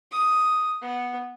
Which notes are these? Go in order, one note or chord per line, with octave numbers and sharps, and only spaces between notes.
D#6
B3